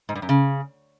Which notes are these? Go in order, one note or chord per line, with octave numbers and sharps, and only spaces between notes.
G#2
G2
F#2
C#3